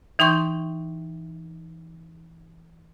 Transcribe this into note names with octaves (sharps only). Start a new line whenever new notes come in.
E3 D#4 G5 C6 C#6 G6